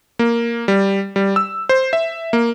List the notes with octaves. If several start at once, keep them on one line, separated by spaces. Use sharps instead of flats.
A#3
G3
G3
E6
C5
E5
A#3